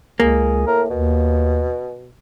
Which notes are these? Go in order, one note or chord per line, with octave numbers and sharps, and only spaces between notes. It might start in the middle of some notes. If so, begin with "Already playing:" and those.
C#2 A#3 G#4
A2 A#4
D#2 B2